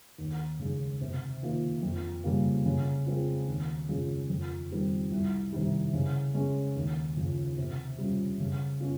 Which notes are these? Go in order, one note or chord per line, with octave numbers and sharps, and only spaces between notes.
D#2
C#3 G#3 D#4
C3
D#3 A#3 F4
F2
C#3 G3 A#3
C#3
G#3 C4 F4
D#2
C#3 G#3 C#4 F4
F2
D#3 G3 C4 D#4
C2
C3 D#3 G3
C#3
G#3 C#4
D#2
C#3 F3
C3
G3 C#4 F4
C#3
C#4 F4